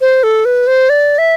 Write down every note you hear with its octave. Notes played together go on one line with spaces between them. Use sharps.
C5
A4
B4
C5
D5
E5